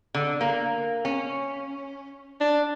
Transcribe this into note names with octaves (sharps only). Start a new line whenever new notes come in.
D3
A#3
C#4
D4